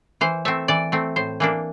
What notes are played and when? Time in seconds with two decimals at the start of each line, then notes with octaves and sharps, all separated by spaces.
0.21 E3 C5
0.45 A3 C4 E5
0.68 E3 D5
0.92 A3 C4
1.16 A2 C5
1.40 E3 A#3 D4